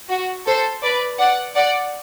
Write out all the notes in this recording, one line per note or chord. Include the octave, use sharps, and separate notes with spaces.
F#4
A4 C5
B4 D5
D5 F#5
D5 F#5